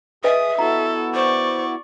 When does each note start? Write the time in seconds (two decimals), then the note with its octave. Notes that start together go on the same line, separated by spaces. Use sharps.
0.24 G#4 B4 D#5 E5 G#5 D#6
0.58 B3 E4 F#4 A4 A#5
1.15 C5 D5 C#6